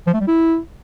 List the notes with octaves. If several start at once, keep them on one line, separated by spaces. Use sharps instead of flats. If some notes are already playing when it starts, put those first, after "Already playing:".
F3
A3
G3
E4